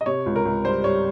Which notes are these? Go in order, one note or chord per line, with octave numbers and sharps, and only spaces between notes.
D#5
C3 C#5
C#2
A#4
C#2
G3 C5
G3 C#5